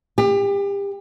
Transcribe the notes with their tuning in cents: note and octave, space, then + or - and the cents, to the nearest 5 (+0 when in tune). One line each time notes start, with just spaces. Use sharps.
G4 +30